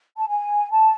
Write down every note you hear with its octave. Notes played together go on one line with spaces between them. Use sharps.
A5
G#5
A5